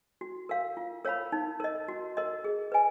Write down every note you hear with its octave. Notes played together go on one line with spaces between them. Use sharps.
F#4
A#4 F5
F4
A#4 C#5 F5 B5
D#4
A#4 D#5
F#4
A#4 D#5
G#4
B4 D#5 G#5